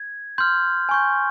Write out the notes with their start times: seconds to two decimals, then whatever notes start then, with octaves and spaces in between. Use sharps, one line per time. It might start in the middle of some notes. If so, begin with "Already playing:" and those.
Already playing: G#6
0.38 C6 F6 G6
0.89 G#5 C#6 G6